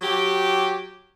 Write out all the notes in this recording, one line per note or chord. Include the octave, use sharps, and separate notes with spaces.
F#3 G4